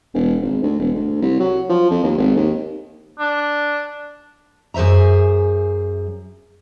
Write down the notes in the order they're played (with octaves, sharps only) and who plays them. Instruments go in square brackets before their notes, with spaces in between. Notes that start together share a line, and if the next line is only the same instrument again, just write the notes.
[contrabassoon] E1
G#1
D2
E1
D2
C2
F#3
F3
F2
D#2
G#1
D#2
[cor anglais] D4
[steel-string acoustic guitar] F#2 G#4 C5 E5 A#5